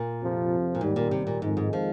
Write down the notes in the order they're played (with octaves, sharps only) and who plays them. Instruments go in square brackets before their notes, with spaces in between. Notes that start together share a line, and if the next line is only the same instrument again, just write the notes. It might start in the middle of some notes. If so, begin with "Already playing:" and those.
Already playing: [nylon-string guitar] A#2
[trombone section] F2 C3 F3
[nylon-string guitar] A#2
[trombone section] D#2 D#3 G3 [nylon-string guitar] G#2
[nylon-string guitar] A#2
C3
A#2
[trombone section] F2 D#3 G#3 [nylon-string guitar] G#2
[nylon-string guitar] G#2
F3